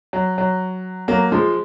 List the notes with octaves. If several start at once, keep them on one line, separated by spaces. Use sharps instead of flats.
F#3
F#3
F#3 A#3
F3 G#3